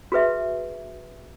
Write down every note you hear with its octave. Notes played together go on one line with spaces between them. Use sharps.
F#4 G#4 B4 E5